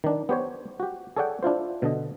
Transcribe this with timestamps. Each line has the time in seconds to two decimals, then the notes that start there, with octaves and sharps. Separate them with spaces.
0.04 D#3 D4
0.29 B3 G4 C5 C#5
0.80 F#4 G4
1.17 G#4 A4 C#5 D5 F#5 G5
1.43 D4 E4 F4 C5
1.82 B2 D3 D#5